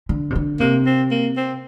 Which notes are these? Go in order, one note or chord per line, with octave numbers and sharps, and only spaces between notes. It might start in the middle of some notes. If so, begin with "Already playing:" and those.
D3
C3
D3
C3 A#3
C4
A#3
C4